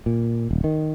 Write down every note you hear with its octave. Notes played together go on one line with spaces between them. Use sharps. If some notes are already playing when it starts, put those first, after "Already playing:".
A#2
D#1
D#3